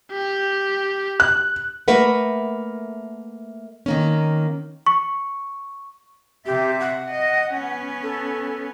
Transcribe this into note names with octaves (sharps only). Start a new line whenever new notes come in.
G4
F#6
A3 A#3 A#4 B4 E5 F#5
D#3 A#3 C#4
C#6
C3 G4 E5
F#5
D#5
B3 C#4
A4